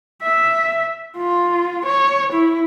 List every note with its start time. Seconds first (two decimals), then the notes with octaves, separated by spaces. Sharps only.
0.22 E5
1.17 F4
1.85 C#5
2.32 E4